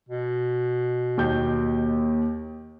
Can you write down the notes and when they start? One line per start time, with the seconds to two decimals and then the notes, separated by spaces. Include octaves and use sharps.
0.09 B2
1.18 D#2 G5 G6